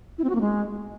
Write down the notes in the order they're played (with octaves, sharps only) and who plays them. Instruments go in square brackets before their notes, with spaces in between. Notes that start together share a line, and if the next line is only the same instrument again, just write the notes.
[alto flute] E4
C4
F#4
A#3
G#3